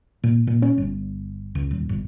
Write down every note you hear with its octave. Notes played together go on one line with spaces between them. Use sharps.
A#2
A#2
C#4
G1
C#2
D#1
G1